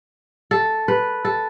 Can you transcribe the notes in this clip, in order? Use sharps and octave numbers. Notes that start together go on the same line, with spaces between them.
A4
B4
A4